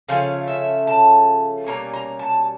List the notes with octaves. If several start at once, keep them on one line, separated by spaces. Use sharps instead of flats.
C#3 F3 A3 C#4 F5
E5
A5
B2 G3 A#3 C#4 A#5
A#5
A5